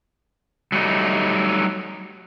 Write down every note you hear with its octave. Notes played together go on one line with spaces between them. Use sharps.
F#3 G3 A3 D#4